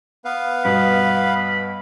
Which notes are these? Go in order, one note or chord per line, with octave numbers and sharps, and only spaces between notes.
B3 B4 F5
G2 B2 B5